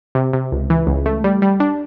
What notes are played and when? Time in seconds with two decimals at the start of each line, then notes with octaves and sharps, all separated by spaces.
0.15 C3
0.33 C3
0.52 C#2
0.70 E3
0.87 C#2
1.06 A3
1.24 G3
1.42 G3
1.60 D4